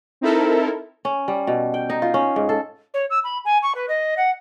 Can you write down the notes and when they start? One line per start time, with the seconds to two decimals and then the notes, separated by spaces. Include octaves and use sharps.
0.21 C4 D#4 E4 A4 A#4
1.05 C#4
1.28 G3
1.47 B2
1.74 G5
1.90 D#4
2.02 F4
2.14 C#4
2.36 G#2
2.49 A4
2.94 C#5
3.10 E6
3.24 B5
3.45 G#5
3.63 C#6
3.75 B4
3.89 D#5
4.17 F#5